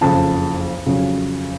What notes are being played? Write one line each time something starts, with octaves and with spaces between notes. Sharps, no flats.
F#1 F2 C#3 A5
F2 C#3 F#3